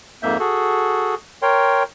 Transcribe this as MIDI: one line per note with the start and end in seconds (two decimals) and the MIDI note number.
0.23 0.37 41
0.23 0.37 44
0.23 0.37 58
0.23 0.37 76
0.23 0.37 91
0.40 1.15 66
0.40 1.15 68
0.40 1.15 69
1.42 1.83 70
1.42 1.83 73
1.42 1.83 79
1.42 1.83 84